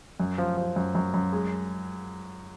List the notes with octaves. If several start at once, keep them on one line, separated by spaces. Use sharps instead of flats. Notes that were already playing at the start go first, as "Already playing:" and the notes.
F#2
F3
F3
F#2
F#2
F#2
G#3